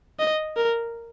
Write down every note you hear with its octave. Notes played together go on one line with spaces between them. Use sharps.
D#5
A#4